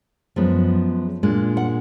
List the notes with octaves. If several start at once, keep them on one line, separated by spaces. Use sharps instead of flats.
F#2 F3 G#3 B3
A#2 G#3 D4 F4
F#5